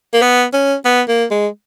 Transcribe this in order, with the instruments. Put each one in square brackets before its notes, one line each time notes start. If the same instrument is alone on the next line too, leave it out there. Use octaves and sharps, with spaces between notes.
[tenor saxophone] A#3
B3
C#4
B3
A#3
G#3